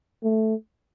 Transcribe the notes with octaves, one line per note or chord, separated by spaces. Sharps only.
A3